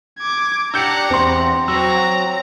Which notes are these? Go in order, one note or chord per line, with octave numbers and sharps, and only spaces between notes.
D6 G#6
D4 G4 F#5 A#5 E6 G6 C#7
E2 C4 C6
F#3 C4 F#4 A#5 E6